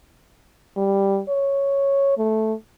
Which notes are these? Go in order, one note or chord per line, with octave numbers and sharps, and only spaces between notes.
G3
C#5
A3